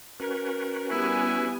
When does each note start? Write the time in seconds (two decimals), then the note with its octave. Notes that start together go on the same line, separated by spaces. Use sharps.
0.20 C#4 F#4 A#4 B4
0.91 G3 B3 E4 G#5